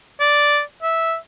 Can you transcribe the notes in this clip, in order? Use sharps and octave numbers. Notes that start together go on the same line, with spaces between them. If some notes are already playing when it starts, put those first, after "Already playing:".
D5
E5